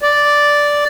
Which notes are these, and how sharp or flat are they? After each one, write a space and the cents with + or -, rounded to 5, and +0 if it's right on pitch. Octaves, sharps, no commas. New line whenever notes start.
D5 -5